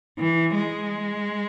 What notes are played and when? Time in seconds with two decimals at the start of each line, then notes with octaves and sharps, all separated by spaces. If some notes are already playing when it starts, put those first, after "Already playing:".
0.18 E3
0.55 G#3